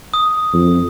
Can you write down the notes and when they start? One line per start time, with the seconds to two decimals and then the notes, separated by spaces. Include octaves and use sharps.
0.14 D#6
0.53 F2